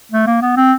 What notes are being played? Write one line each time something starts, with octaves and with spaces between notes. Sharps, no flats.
A3
A#3
B3
C4